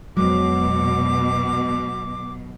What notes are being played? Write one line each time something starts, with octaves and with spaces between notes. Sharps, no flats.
F2 B2 F#3 G#3 D6